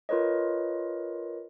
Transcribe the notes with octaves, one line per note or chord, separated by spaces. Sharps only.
F4 A#4 B4 C#5 D#5